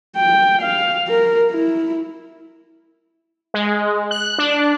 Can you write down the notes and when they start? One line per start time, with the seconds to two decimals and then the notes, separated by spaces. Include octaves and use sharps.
0.17 G5
0.62 F5
1.08 A#4
1.52 E4
3.54 G#3
4.11 F#6
4.38 D4